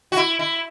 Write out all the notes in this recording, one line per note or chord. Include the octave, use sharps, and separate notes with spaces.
F#4
E4
E4